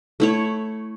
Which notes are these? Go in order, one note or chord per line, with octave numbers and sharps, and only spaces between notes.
A3 E4 C#5